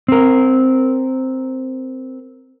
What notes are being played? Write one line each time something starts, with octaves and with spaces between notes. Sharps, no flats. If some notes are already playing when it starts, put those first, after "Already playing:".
C4 A#4